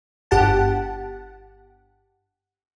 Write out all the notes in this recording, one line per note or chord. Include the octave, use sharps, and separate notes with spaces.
G1 G4 F#5 A5